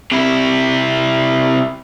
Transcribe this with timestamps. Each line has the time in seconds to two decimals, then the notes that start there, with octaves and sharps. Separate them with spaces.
0.11 C3 E4